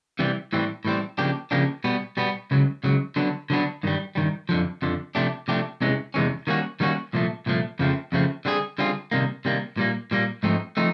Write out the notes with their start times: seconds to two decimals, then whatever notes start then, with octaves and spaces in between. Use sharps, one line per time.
0.19 C3 E3 G3
0.53 A2 E3 G3 C4
0.85 A2 E3 G3 C4
1.18 C#3 F3 A#3 D4 G4
1.51 C#3 F3 A#3 D4 G4
1.84 B2 G3 B3
2.17 B2 G3 B3
2.51 C#2 C#3 F#3
2.84 C#2 C#3 F#3
3.16 D3 F#3 B3 D4
3.50 D3 F#3 B3 D4
3.83 G2 D#3 G3
4.15 G2 D#3 G3
4.49 F2 D3 F3
4.82 F2 D3 F3
5.15 C3 F3 A3 D4 G4
5.48 C3 F3 A3 D4 G4
5.81 E2 C3 E3 G#3 C#4
6.14 E2 C3 E3 G#3 C#4
6.47 D#3 G3 A#3 C#4 F#4
6.80 D#3 G3 A#3 C#4 F#4
7.13 C2 A#2 F3 A3
7.46 C2 A#2 F3 A3
7.79 F2 C#3 F3 A3 C4
8.12 F2 C#3 F3 A3 C4
8.45 D3 G3 C4 F4 G#4
8.78 D3 G3 C4 F4 G#4
9.12 C3 D#3 G3 A#3
9.45 C3 D#3 G3 A#3
9.77 A#2 G3 A#3
10.11 A#2 G3 A#3
10.43 G#2 F3 A3 C4 D#4
10.77 F3 A3 C4 D#4